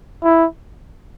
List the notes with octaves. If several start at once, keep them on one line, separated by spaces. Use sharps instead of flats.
E4